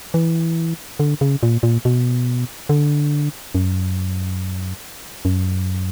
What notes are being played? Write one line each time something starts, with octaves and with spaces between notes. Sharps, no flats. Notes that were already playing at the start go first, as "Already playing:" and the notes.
E3
D3
C#3
A#2
A#2
B2
D3
F#2
F#2